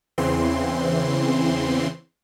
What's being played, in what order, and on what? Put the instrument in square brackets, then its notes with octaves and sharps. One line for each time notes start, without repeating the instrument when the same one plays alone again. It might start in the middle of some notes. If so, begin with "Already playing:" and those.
[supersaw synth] E2 C#3 E3 C4 C6